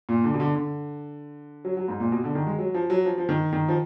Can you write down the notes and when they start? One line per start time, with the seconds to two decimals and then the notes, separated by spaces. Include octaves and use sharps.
0.09 A#2
0.24 D3
0.34 B2
0.40 D3
0.55 D3
1.65 F#3
1.77 F#3
1.88 G#2
2.00 A#2
2.12 B2
2.24 D3
2.35 D#3
2.47 G#3
2.58 F#3
2.74 F3
2.90 F#3
3.06 F3
3.18 F3
3.29 D#3
3.53 D#3
3.68 F3